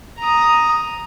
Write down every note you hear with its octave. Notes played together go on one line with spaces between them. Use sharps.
A#5 D#6